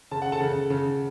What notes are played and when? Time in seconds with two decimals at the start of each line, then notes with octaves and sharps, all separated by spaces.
0.11 C#3 A5
0.22 F#5
0.32 A4 A5
0.41 C#3
0.70 C#3